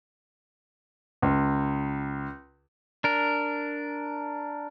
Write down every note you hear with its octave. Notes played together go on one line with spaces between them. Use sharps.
C#2
D4 A#4